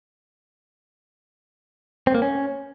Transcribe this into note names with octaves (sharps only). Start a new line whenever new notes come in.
C4
A#3
C#4